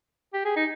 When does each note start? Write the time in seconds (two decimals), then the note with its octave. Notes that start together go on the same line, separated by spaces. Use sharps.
0.33 G4
0.45 G#4
0.56 D#4